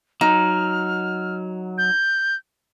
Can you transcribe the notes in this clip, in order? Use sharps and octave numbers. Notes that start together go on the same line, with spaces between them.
F#3 D#4 F6
G6